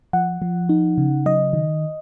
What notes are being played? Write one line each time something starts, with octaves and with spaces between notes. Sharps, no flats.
F3 F#5
F3
D#4
C#3
F#3 D#5
D#3